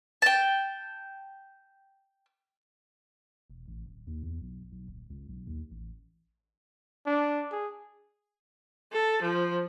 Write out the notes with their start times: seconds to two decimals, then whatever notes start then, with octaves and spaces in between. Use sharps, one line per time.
0.22 G5 A5
3.50 E1
3.68 A1
3.86 D1
4.07 D#2
4.23 E2
4.41 B1
4.72 B1
4.88 D#1
5.10 C#2
5.29 B1
5.47 D#2
5.71 A1
7.06 D4
7.52 G#4
8.93 A4
9.22 F3